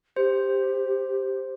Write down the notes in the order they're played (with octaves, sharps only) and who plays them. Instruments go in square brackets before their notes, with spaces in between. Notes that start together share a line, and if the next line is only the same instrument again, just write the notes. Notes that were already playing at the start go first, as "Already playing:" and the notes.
[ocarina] G4 [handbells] C5